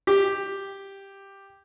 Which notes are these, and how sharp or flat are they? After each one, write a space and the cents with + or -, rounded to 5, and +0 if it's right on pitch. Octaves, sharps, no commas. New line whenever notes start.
G4 +5